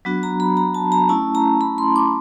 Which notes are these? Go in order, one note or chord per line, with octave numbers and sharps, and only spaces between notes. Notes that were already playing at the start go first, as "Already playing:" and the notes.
F#3 B3 D4 F#4
A#5
B5
A#5
A5
A#5
A3 C#4 E4 A5
A#5
B5
C6
D6